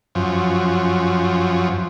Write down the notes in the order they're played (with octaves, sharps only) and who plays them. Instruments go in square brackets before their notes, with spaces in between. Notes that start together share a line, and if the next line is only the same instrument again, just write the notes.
[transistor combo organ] F#2 F3